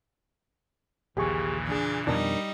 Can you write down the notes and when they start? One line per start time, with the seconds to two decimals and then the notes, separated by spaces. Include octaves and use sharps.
1.17 A#1 D#2 A#2 C#3 E3 G4 G#4 C#6
1.67 E2 D4 G#4
2.07 F2 B2 D#3 G3 D4 D#4 A#4